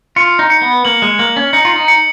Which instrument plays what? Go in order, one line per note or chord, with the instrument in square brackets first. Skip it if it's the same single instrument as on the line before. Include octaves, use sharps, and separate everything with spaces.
[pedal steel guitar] F4 [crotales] C#7
[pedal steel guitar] D#4
[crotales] C#7
[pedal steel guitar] B3
[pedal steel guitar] A#3 [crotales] F#7
[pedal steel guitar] G#3
[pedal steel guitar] A#3 [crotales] F#7
[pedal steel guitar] C#4
[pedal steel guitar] D#4 [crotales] C#7
[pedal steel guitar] F4
D#4
[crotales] C#7